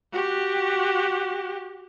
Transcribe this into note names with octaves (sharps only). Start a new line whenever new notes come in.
F#4 G4